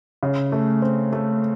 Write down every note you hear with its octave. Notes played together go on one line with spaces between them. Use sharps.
C#3
A3
C4
A3